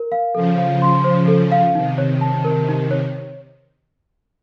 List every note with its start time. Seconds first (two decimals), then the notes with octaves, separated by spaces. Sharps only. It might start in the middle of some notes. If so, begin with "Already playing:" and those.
Already playing: A#4
0.12 F5
0.35 C#3 F3 A4
0.58 F5
0.82 C6
1.04 C5
1.28 A4
1.52 F5
1.74 C3 D#3 D#4
1.98 C#5
2.21 A5
2.44 A#4
2.69 D#4
2.91 C#5